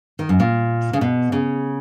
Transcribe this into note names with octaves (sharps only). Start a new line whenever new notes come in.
D#3
F#2
A#2
C#3
B2
C#3